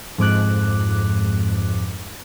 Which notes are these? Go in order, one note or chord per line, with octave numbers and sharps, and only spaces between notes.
F2 G#2 D6 F#6